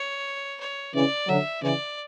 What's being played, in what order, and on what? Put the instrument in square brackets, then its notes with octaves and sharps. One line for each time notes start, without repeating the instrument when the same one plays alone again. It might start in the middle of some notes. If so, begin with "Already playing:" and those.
Already playing: [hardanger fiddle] C#5
C#5
[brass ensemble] C#3 E3 [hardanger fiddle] D5
[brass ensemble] D3 F#3 [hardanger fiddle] E5
[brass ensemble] C#3 E3 [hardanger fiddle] D5